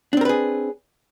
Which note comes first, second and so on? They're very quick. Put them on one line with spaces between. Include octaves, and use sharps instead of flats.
D4 C4 A#4 B4 G#4